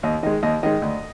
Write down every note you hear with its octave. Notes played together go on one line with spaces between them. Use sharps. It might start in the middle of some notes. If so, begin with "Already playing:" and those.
D#2 D#5
D#3 G#3 D#5
D#2 D#5
D#3 G#3 D#5
D2